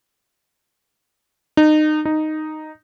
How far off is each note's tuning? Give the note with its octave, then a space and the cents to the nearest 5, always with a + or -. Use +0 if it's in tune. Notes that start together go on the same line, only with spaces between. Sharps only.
D#4 -25
D#4 -5